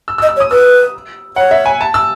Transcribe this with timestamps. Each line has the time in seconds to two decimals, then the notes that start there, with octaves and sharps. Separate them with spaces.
0.08 E6
0.18 E6
0.22 D#5
0.29 E6
0.36 C#5
0.40 D#6
0.51 B4 E6
1.36 C#5 F#5
1.51 E5
1.66 G#5
1.81 A5
1.94 E6